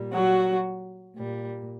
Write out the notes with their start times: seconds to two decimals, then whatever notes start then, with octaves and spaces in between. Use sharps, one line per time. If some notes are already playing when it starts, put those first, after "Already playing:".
Already playing: A#2 G3
0.13 F#3 F#4
1.17 A#2 G3